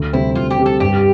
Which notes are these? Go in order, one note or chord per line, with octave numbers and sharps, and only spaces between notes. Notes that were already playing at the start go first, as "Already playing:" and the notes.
Already playing: D2
C3 G3 C4 E4
D2 F4
G4
C3 G3 C4
A4
G2 G4